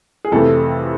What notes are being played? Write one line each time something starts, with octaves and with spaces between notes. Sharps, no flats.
G#4
F2 C3 E3 A3 A4